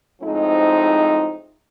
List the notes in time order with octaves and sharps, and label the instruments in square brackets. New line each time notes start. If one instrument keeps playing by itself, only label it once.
[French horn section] A2 F3 G#3 C4 D#4